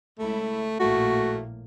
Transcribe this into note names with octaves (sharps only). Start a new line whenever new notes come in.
C#2 A3 E4
A#1 A2 A3 A#3 F#4